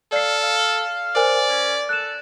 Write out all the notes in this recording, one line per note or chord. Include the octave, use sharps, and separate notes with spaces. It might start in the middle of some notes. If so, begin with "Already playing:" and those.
A4 D5 F5 C7
F5
A#4 C5 D5 G#5
C#4
A4 F#6 E7